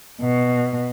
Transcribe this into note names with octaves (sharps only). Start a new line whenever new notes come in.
B2